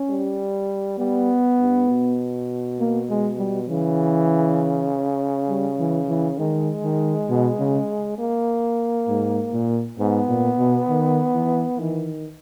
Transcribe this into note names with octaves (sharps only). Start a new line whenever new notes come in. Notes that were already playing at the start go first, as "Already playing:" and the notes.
Already playing: C#4
G3
G3 B3
G2
B2
A#3
G#3
G3
C#3 E3
G3
E3
E3
D#3 G#3
D#3
B2
C#3
A#3
G#2
A#2
G#2 B3
A#2
B2
D#3
E3
D#3 E3